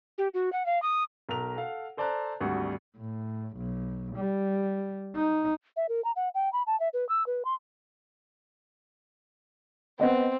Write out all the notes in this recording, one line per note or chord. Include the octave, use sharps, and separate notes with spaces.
G4
F#4
F#5
F5
D#6
B1 A#4 A#5 F7
A4 F5 F#5
A4 C5 D5 A5 A#5 F#6
G#1 D2 G3 F#4
A2
B1
G3
D#4
E5
A#4
A#5
F#5
G5
B5
A5
E5
B4
E6
B4
C6
B3 C4 D#5 F#5